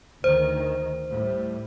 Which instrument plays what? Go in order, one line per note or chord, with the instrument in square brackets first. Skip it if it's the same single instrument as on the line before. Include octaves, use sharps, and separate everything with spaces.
[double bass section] D2 D#3 [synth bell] C5
[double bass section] A2 G3